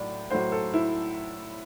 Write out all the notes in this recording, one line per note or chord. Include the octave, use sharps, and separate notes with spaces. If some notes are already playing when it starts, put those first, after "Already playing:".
Already playing: A2 F#3 D5
A2 F#3 C5
A4
E4